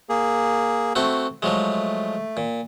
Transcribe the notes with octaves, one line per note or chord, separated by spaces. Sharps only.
A#3 G#4
A3 C4 F#4
F3 F#3 G#3 A3
A#2